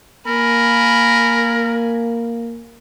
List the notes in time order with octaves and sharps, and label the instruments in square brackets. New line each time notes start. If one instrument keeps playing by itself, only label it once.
[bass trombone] A#3 [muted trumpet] A#4 [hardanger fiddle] G#5 B5